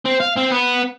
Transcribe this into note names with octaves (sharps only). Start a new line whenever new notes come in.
C4
F5
C4
B3